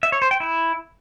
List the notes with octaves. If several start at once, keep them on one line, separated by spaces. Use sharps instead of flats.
E5
C#5
C5
G5
E4